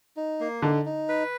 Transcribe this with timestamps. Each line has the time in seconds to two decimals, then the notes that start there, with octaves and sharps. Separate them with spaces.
0.16 D#4
0.40 A#3
0.62 D3 D#4
0.85 D#4
1.09 B4